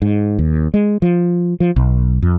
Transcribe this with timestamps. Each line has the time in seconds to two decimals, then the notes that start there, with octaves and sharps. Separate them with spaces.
0.02 G#2
0.39 D#2
0.74 G#3
1.02 F3
1.60 F3
1.76 B1
2.22 F2